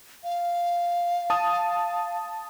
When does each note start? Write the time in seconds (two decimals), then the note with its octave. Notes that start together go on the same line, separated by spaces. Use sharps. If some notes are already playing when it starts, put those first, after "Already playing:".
0.24 F5
1.30 A5 D#6